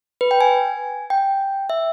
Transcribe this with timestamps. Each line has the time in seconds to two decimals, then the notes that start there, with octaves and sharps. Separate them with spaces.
0.21 B4
0.31 G5
0.41 G#5
1.10 G5
1.70 E5